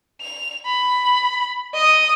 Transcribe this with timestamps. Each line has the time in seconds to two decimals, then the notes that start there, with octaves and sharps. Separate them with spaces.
0.22 F7
0.66 B5
1.75 D#5 D#6